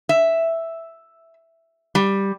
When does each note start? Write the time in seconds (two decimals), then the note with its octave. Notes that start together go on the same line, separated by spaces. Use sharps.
0.09 E5
1.95 G3